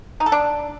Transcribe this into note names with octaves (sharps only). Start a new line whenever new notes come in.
D#4
A4
D4